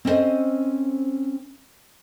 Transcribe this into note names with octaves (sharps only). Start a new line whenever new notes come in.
C4 C#4 E4 A4 C5 D#5